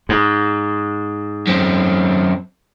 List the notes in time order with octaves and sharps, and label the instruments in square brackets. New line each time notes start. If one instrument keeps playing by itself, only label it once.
[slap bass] G#2
[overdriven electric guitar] F#2 C4